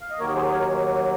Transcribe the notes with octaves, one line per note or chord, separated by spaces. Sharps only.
F5
D#5
D#2 D#3 F#3 A#3 A#4 C#5
G#4 C5
A#4 C#5